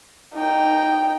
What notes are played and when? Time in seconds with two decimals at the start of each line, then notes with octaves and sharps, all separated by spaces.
0.35 D#4 G5